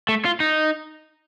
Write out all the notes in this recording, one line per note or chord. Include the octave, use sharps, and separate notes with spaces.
A3
F4
D#4